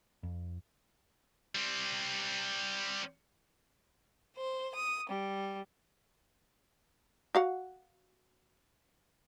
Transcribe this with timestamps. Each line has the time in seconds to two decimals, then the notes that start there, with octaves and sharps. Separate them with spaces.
0.23 F2
1.55 G3 C4
4.36 C5
4.74 D#6
5.09 G3
7.35 F#4 F5 F#5